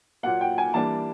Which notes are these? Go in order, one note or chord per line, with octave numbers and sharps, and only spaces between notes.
A#2 F#3 A#3 F#5
G5
G#5
E3 G3 A#3 D4 A5